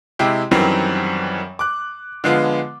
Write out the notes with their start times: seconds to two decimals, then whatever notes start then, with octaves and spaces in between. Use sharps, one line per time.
0.19 C3 G#3 E4 G4
0.51 F#2 D#3 E3 F#3 G3 C4
1.59 D6 F#6
2.24 D3 F3 G#3 B3 F4